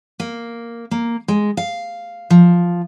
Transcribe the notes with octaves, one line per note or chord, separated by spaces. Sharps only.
A#3
A#3
G#3
F5
F3